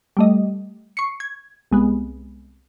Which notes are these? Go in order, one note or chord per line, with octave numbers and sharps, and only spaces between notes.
G3 A3 D#5
C#6 C7 C#7
G#6
C2 G#3 B3